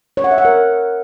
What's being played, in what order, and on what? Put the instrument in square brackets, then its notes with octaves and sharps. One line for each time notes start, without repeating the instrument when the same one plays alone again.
[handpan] C#5
F#5
E5
F#5
A#4